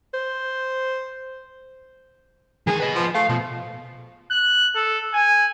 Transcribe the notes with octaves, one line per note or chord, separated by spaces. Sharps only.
C5
D#3 G#4 G#5
B4 D#5
F3
A3 F5
B2 F3
F#6
A4
G#5